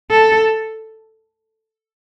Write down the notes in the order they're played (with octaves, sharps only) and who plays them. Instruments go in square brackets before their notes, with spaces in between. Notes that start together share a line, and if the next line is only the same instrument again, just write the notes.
[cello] A4